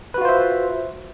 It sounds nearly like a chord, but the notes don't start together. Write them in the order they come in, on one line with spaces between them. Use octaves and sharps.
B4 F#4 F4 C5 E5